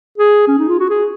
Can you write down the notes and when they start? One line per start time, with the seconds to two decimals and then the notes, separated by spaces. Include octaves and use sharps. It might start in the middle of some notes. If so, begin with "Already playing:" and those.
0.18 G#4
0.48 C#4
0.59 D#4
0.69 F4
0.80 F#4
0.90 G#4